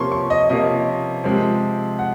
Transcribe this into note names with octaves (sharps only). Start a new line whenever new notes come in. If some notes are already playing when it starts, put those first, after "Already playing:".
Already playing: C3 F3 A#3 C#4 C6 C#6
C#6
D#5
C3 F3 A#3 C#4 D#5
C3 F3 G#3 C4
F#5